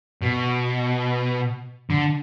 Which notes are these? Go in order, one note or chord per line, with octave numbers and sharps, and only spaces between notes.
B2
D3